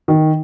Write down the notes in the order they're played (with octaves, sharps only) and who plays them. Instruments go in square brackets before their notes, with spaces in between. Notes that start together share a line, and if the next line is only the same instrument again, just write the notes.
[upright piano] D#3